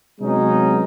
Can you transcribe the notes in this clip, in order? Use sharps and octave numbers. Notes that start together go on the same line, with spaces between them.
C3 F#3 G#3 B3 C#4 D#4